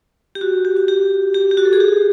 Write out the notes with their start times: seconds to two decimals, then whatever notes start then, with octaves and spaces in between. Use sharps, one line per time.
0.35 G4
0.41 F#4
0.65 G4
0.76 F#4
0.88 G4
1.34 G4
1.51 G4
1.57 F#4
1.65 A4
1.73 G#4
1.80 G4